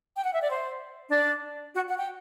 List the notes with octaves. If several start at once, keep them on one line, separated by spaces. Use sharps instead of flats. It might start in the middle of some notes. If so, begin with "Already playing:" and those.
G5
F#5
E5
D5
C5
D4 D5
F#4 F#5
F#5
G5